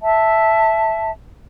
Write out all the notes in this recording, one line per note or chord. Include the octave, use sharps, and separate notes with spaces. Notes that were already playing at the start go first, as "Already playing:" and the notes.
E5 A5